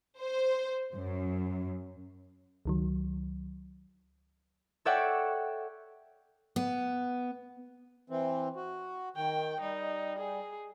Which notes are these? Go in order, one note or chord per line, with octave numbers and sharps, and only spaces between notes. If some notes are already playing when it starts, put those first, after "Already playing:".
C5
F#2
C#2 D#3 F#3
A4 C#5 D5 E5 F#5 G5
B3
E3 C4
F#4
D#3 G5
G3 D#4
G#4